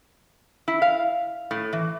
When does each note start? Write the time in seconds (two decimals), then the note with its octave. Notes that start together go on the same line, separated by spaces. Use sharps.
0.68 E4
0.82 F5
1.51 A2
1.73 E3